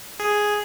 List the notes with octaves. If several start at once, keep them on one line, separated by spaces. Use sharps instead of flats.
G#4